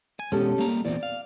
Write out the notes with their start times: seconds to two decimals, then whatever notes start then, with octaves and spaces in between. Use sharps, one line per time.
0.19 G#5
0.32 B2 G#3 C#4 G4 A4
0.58 G3 A#3 A#5
0.85 E2 A#2 C4 D5
1.03 F5